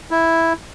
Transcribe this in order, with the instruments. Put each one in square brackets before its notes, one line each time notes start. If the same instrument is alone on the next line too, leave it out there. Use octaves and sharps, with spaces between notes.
[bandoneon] E4